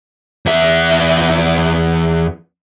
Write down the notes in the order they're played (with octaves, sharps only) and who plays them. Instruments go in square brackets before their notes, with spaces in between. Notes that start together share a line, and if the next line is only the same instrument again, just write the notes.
[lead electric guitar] E2 E5